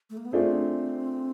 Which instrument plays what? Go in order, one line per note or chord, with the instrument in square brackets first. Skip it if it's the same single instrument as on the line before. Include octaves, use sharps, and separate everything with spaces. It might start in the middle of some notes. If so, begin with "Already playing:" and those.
[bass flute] A3
A#3
B3
[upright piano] A3 D4 F4 G#4 C5 [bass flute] C4